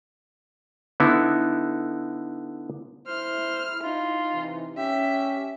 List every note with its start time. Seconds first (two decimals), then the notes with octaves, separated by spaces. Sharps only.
1.00 D3 B3 D#4 E4
3.07 E4 C5 F6
3.83 D#4 F4
4.34 C3 E3
4.77 C#4 G4 E5